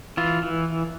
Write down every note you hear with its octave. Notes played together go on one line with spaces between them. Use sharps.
E3 F4
E3